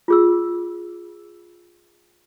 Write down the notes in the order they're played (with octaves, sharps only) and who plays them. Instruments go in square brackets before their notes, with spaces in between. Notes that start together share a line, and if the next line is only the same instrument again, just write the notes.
[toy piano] F4 G#4 E6